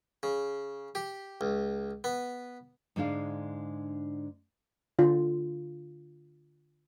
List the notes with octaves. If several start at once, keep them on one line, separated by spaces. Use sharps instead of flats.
C#3
G4
C#2
B3
G#2 D3 G#3 D4 F5
D3 F4